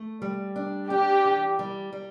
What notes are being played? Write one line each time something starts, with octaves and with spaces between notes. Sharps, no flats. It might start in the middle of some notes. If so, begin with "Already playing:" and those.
Already playing: A3
G3
D4
D4 G4
E3
G3
G3